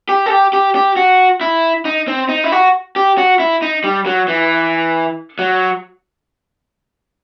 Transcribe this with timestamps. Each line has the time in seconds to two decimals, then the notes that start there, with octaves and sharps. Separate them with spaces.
0.09 G4
0.26 A4
0.30 G4
0.53 G4
0.75 G4
0.96 F#4
1.41 E4
1.85 D#4
2.08 C4
2.29 D#4
2.44 E4
2.52 F#4
2.96 G4
3.18 F#4
3.40 E4
3.62 D#4
3.84 G3
4.06 F#3
4.28 E3
5.39 F#3